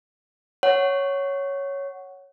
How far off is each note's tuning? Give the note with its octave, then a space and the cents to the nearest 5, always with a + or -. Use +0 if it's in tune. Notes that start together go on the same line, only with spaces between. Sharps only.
C#5 +0 F#5 +5